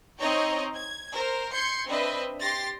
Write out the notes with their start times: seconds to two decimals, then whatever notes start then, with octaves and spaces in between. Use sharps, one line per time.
0.20 C4 D#4 C#5 D#5 G5 A#5
0.75 G#6
1.14 A#4 C5
1.53 C6 G6 G#6 C#7
1.88 C4 D4 B4 D#5 E5
2.40 G4 C6 A6 A#6